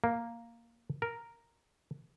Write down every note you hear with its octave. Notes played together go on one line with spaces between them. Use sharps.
A#3
A#4